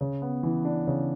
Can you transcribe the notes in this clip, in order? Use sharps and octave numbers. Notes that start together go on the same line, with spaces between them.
C#3
B3
E3
D4
C#3